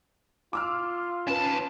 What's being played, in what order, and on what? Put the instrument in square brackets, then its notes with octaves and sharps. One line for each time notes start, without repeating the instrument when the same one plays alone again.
[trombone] F4 [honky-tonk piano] D6 E6 F6
[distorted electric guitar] D#2 A5 [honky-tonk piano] C#4 B4